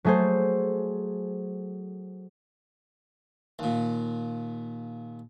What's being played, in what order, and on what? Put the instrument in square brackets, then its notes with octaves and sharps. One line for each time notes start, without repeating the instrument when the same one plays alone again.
[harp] F#3 A3 G#4 A4 C5
[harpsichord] D#2 A#2